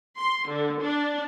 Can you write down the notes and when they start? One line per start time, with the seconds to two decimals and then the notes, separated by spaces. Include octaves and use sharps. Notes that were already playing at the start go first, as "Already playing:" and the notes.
0.17 C6
0.48 D3
0.82 D4